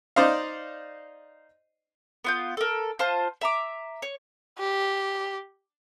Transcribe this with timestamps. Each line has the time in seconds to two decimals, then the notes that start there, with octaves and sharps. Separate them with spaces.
0.16 D#4 C5 D5 D#5 F5
2.24 B3 F4 G6
2.57 A4 A#4
2.99 F4 C5 A5
3.41 E5 A#5 D6
4.02 C#5
4.59 G4